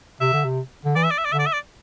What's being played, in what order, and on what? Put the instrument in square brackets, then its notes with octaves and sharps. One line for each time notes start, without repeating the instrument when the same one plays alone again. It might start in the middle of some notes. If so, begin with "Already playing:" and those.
[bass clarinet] C3 [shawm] E5
[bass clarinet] D3
C3
D3
[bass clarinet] E3 [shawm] D5
[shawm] E5
D5
E5
D5
[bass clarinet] D3 [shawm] E5
[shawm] D5
E5
D5